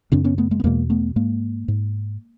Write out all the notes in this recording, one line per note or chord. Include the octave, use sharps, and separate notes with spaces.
F#2 C#3 C4 D4
B3 C#4
A3 B3
G#3 A#3
B3
E2 B2 G#3 A#3
A3 B3
G#2 G#3 A#3
G#2